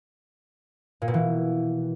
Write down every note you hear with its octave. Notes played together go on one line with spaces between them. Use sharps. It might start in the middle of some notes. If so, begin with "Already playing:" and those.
A#2
B2
E3